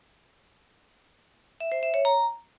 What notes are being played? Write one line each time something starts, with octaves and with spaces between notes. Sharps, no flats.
E5
C5
E5
C#5
A#5